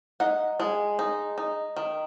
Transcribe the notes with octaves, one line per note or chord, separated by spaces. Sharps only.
D#4 F#5
G#3
D#4
D#4
D#3